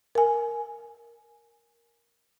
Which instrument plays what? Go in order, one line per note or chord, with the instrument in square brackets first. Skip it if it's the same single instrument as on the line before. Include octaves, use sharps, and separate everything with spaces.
[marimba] A#4 G#5